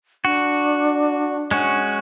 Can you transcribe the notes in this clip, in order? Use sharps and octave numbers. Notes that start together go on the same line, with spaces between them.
D4 F#4
G#3 C#4 F#4